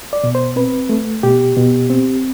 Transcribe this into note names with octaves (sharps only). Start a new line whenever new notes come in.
D5
B2
C5
C4 B4
A3
B2 G4
B2
C4